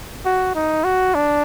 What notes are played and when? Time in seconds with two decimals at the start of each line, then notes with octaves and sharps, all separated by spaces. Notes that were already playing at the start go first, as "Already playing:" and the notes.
0.25 F#4
0.55 D#4
0.84 F#4
1.14 D4